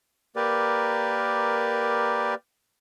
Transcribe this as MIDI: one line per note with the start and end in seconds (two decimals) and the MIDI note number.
0.36 2.34 58
0.36 2.34 67
0.36 2.34 70
0.36 2.34 71
0.36 2.34 74